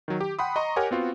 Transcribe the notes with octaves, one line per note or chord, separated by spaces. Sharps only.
D#3 F#3
G4
F#5 G5 B5 C6 D#6
D#5 A#5 C6 C#6 D#6
G4 A#4 C#5 F#5 G#5
B3 C4 F4 F#4